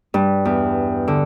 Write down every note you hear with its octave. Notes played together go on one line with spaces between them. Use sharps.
G2
E2
D3